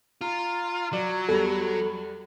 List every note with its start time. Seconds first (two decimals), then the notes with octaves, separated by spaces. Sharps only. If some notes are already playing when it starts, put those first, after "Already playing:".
0.21 F4 A#5
0.93 F#3 D5
1.29 E2 G3 A4 B5